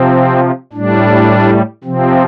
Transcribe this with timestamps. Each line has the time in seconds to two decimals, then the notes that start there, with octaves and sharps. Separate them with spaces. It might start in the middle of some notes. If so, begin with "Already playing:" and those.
Already playing: C3 F3 C4
0.73 A2 G3 D4
1.84 C3 F3 C4